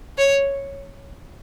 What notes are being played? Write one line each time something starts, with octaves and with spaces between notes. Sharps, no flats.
C#5